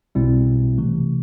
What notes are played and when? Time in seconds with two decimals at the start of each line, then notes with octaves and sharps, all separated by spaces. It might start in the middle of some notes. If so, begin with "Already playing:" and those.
0.15 B1 B2 G3 C4 E4
0.78 C3 E3 A3